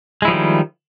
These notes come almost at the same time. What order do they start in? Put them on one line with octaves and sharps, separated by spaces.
G#3 E4 F3 G3 D#3